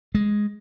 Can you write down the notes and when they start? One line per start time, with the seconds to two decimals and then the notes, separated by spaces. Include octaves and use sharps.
0.15 G#3